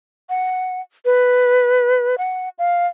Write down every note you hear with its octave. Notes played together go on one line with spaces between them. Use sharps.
F#5
B4
F#5
F5